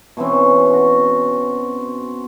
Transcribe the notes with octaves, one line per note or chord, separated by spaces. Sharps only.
B2 E3 C4 C#4
F#4